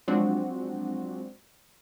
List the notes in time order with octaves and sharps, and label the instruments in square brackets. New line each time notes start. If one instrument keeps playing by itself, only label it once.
[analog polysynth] F3 F#3 G#3 C4 D4 F#4